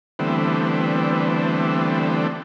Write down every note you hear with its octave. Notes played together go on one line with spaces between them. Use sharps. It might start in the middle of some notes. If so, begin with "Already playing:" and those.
D3 E3 G3 A3 B3 C4